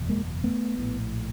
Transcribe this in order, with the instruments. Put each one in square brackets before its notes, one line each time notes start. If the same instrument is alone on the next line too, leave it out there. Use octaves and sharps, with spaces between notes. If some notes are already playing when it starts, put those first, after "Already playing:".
Already playing: [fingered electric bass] F#1 E2 B2
G#3 A#3
A3 B3
A#1 A2